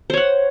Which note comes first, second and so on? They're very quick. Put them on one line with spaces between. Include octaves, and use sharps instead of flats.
C5 C#5 F#5